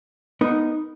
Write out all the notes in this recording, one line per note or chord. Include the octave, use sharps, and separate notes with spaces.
B3 D#4 A#4